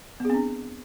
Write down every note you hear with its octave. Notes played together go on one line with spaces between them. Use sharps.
B3 C4 D4 G#4